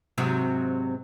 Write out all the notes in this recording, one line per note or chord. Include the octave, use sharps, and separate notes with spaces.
G#2 C3 F#3